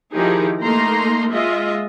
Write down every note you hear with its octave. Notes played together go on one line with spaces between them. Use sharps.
D#3 F3 D#4 E4 G4 G#4
A3 A#3 D#4 A#5 C6
G#3 F4 D#5 E5